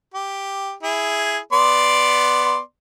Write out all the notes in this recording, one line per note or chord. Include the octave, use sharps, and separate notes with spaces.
G4
E4 G#4
B3 D5 C6